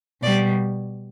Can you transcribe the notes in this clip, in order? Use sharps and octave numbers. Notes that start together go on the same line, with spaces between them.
B2 G3 D5